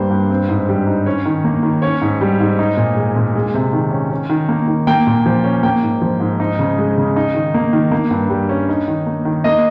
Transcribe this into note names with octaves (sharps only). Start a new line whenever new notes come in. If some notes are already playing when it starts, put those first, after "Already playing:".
Already playing: G2 G3 A#3 C5
G2
C4
G#2
G3
D#4
C#4 C#5
D#3
A#3
D#3
C#4 C#5
G#2
G3
G#2
D#4
A#2
G#3
A#2
G#3
C3
D#3
C#4
C#4
D#3
A#3
D#3
A#3 G5
A#2
F3
C#4
A#3 G5
G#2
F3
G#2
D#4
C#3
G#3
C#3
D#4
D#3
A#3
D#3
A#3
G2
G3
C#4
D#4
D#3
A#3
D#3
A#3 D#5